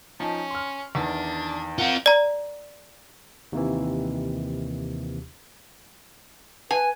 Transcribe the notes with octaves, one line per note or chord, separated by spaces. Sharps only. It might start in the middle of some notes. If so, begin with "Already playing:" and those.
F3 C#4 D#4 A5
C6 F6
E2 D#3 D4
C4 F4 A#4 F#5
D5 A#5
D#2 C3 E3
B4 G#5